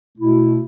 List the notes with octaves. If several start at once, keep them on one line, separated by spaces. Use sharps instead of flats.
B2 A3 E4